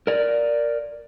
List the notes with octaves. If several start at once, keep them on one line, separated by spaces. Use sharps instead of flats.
A#4 D5